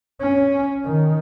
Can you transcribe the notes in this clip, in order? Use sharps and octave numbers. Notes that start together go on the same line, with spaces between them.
C#4
D#3